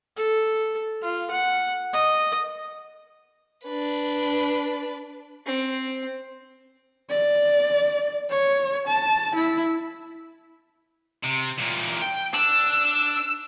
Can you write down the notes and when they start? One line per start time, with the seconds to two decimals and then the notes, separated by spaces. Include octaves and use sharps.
0.17 A4
1.02 F4
1.31 F#5
1.93 D#5
3.64 D4 B4
5.46 C4
7.10 D5
8.30 C#5
8.87 A5
9.35 E4
11.24 C3
11.59 E2 A#2
12.02 G5
12.34 D4 E6